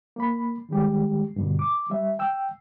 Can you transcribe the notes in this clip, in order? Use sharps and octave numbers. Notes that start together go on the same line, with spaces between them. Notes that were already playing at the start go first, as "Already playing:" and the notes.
A#3 B5
D#3 G3 G#3 G4
G2 B2 D3
D6
G3 E5
G5 E6